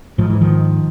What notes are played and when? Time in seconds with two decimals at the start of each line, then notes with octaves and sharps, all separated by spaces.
0.18 G#2 F3
0.30 E3
0.41 D#3 F3